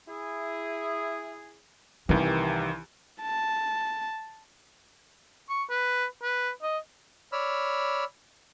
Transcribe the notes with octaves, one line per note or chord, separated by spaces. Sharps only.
E4 G#4
C2 D#3 E3 E4 G4 A#4
A5
C#6
B4
B4
D#5
C#5 D5 B5 E6 F6